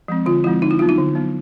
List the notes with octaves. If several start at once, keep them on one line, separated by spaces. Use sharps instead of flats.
F3 G#3 C4
D3 F4
F3 G#3 C4 E4
D3 D#4
E4
F#3 B3 F4
D#4
D3
F#3 B3